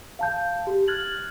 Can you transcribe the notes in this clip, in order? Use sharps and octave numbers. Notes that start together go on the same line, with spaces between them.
F5 A5 G6
G4
F6 F#6 G#6 A6 F#7